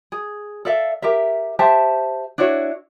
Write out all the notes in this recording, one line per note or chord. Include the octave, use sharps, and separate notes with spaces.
G#4
A4 D5 E5 F5
G4 A#4 E5
G4 C5 E5 A5
D4 E4 F#4 C#5